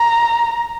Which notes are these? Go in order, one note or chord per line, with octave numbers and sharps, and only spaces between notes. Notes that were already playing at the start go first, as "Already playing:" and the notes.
Already playing: A#5